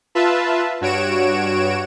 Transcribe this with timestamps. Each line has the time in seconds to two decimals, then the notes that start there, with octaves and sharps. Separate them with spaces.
0.15 F4 B4 E5 A5
0.81 G2 F#4 C#5 D7 E7